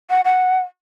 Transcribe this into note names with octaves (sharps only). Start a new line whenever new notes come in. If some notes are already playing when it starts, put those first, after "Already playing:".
F#5
F#5